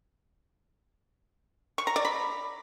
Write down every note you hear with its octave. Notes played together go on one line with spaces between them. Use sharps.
C#6
A#5
D5
B5